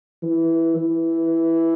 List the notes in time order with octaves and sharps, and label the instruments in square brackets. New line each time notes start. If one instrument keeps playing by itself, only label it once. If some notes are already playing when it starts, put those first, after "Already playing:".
[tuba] E3
E3